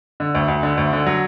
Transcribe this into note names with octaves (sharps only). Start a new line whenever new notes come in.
D3
D2
D2
D3
D2
D3
F#3